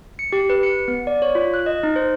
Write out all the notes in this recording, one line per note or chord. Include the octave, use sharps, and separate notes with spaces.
C#7
G4
B4
C#7
B3
D5
C#5
F4
F#6
D#5
D#4
C5